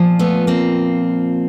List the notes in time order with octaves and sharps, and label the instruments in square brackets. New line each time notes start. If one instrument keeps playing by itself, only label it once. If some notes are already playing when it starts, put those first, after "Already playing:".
Already playing: [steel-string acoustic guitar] A#2 F3
A3 B3
A#3 C4